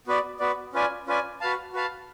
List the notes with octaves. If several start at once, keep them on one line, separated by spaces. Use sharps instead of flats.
B3 F#4 B4 D5
B3 F#4 B4 D5
C#4 F4 B4 D5 G#5
C#4 F4 B4 D5 G#5
F#4 B4 F5 A5
F#4 B4 F5 A5